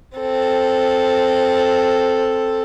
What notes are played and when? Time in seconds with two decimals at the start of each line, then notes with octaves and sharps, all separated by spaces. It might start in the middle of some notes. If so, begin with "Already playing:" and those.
0.16 C4 A4